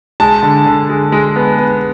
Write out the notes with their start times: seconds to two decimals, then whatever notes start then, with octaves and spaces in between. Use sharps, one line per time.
0.20 G#3 A5
0.43 D3
0.66 D3
0.89 G#3
1.12 G#3
1.36 B3
1.58 B3